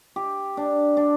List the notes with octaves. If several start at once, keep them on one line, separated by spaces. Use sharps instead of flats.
G4
D4
D4